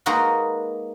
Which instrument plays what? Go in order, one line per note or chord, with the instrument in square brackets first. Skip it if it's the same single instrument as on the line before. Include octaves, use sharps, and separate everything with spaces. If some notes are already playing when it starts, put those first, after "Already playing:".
[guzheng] G#3 A#3 D#4 F#4 B4 F#5